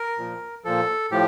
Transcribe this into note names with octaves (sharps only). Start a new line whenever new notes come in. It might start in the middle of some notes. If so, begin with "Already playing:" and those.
Already playing: A#4
A#2 F3
A#2 F3 A4
A2 F3 G4